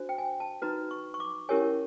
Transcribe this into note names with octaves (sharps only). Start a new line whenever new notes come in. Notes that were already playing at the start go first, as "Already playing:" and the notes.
Already playing: D4 F#4 C5
G5
G#5
A5
D#4 F#4 B4 A#5
C#6
C#6
D6
C#4 E4 G4 A#4 C#5 G#5